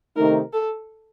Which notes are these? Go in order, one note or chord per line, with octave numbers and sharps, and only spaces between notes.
C3 D#3 A3 D#4 A#4
A4